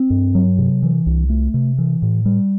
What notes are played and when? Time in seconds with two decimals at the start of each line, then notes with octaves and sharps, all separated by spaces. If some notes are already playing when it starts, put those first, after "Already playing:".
Already playing: C4
0.10 G2
0.35 F#3
0.58 C3
0.83 E3
1.06 C2
1.29 A3
1.54 C3
1.78 E3
2.02 A2
2.25 G3